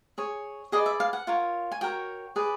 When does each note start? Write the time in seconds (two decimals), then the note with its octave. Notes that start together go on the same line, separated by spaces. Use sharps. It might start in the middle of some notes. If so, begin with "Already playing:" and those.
0.18 G#4 C#5
0.72 G#4 B4 D5 D#5
0.86 E5
1.00 F5
1.13 F#5
1.27 F4 A#4 C#5
1.72 G#5
1.81 F#4 A#4 C#5 G5
2.36 G#4 B4 D5